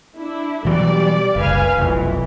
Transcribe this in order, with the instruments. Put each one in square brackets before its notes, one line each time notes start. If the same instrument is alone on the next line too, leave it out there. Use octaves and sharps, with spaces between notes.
[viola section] D4 E4
[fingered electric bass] B2 E3 F#3 [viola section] G3 D5
[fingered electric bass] F#1 C2 [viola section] B4 F5 G#5
[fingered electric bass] F1 B1 [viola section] E3